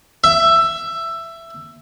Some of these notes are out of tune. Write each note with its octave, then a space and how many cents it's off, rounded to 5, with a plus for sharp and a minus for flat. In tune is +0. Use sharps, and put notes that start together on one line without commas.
E5 +15